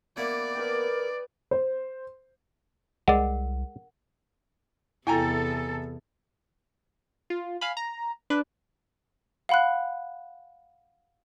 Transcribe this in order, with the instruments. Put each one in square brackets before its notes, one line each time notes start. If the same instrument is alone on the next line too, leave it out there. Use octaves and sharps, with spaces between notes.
[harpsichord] A#3 B3 E4 [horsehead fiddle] D5
[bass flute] A#4 [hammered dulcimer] B4 D#5 G5
[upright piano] C5
[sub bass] C2 [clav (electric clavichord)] G#3 D5 [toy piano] A#4 F#5
[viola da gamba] E2 C3 [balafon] E4 [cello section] A4 [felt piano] G5 G#5 A#5
[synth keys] F4
F5 G#5 B5
A#5
[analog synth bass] D4 [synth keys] B4
[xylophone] F5 F#5 B5 C6 F#6